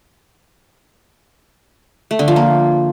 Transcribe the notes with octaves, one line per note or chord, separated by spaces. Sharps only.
A3
D3
F3
A#3